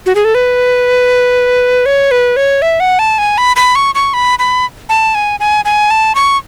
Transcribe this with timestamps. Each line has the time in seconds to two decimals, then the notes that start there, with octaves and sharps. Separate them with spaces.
0.06 F#4
0.15 G#4
0.25 A4
0.35 B4
1.86 C#5
2.11 B4
2.36 C#5
2.62 E5
2.80 F#5
2.99 A5
3.18 G#5
3.38 B5
3.56 B5
3.75 C#6
3.95 C#6
4.14 B5
4.39 B5
4.89 A5
5.15 G#5
5.40 G#5
5.65 G#5
5.90 A5
6.15 C#6